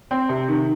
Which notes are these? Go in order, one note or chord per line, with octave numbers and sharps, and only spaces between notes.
C4
C3
D#3